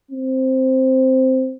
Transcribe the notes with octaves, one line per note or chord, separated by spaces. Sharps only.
C4